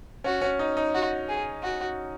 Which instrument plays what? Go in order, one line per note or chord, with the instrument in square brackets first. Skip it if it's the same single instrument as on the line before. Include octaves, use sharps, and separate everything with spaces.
[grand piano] C#4 [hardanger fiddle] F#4
[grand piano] C#4
D#4
D#4
[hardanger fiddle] F#4
G#4
F#4